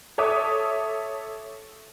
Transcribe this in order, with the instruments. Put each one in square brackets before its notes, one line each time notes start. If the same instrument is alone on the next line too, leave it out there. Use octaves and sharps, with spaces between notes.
[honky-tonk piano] A4 C#5 E5 D6 D#6